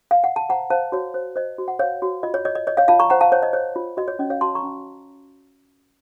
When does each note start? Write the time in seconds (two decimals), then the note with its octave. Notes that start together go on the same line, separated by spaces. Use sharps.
0.11 F5
0.24 F#5
0.36 A5
0.49 C5 F#5 A#5
0.70 C5 F5 A5
0.92 F#4 C#5
1.14 C5
1.36 C5 D#5
1.58 F#4
1.68 F#5
1.79 C5 C#5 F5
2.02 F#4
2.23 F4 D#5
2.34 C#5
2.45 C#5 D#5
2.55 D#5
2.67 C#5 D#5
2.77 C#5 F5
2.88 F4 F5 A5
2.99 A#5 C#6
3.10 C5 F#5 A#5
3.21 F5 A5
3.32 C5 C#5
3.43 D#5
3.53 C5 C#5
3.76 F4
3.97 F#4 D#5
4.08 C#5
4.19 C#4 D#5
4.30 C#5 F5
4.41 F#4 A5 C6
4.55 A#5 C#6
4.63 C#4